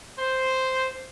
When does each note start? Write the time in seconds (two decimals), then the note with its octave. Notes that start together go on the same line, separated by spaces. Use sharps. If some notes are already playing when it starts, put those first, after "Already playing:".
0.19 C5